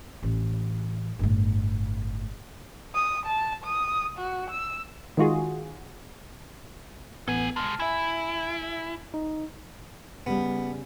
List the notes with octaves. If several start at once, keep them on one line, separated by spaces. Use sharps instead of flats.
A1
G1 A2
D#6
A5
D#6
F#4
E6
D#3 G#3 F4 F#4 G#4
A1 B3 A4 G#5 G#6
C2 G#3 A5 F6
E4 E5 G#5
D#4
C#3 G3 B3